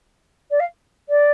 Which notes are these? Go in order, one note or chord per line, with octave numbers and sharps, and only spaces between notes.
D5
F5
D5